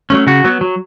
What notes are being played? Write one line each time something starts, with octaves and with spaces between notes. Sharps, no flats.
F#3 A3 C#4
C#3 F#4
F#3 B3
F#3